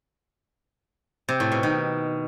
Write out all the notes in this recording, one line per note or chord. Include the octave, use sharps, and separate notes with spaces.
C3
A2
B2
D#3